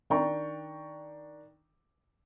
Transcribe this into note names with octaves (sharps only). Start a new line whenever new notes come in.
D#3 D4 G5 A#5 C#6